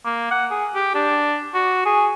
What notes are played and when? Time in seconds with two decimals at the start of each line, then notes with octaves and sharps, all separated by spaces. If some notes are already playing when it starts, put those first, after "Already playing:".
0.05 A#3
0.31 F#5
0.51 G#4
0.75 G4
0.94 D4
1.54 F#4
1.86 G#4